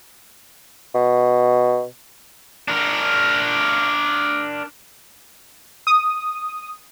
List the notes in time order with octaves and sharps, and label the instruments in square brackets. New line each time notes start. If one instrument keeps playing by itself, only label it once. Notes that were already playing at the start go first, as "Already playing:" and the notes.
[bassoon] B2
[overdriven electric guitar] D4 A#4
[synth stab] D#6